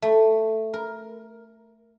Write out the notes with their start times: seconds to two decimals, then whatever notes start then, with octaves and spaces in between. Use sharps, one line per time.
0.02 A3
0.73 A#4